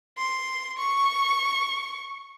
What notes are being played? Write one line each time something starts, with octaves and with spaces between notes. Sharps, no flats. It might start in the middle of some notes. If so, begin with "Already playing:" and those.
C6
C#6